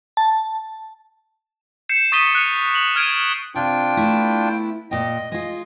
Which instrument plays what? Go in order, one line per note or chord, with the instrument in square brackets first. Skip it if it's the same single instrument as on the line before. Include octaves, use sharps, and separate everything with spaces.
[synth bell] A5
[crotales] G6 C7 C#7 E7
C#6 D#6 A6 B6 D#7 G7
D#6 F#6 C#7 D#7 F7
F7 F#7
F6 G#6 D7 D#7 F7
[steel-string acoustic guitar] C3 [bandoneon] D4 F4 G5
[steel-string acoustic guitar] A3 B3 E4
[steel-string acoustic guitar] A#2 G5 [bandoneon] D#5
[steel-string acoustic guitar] G#3 F4 [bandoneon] D#5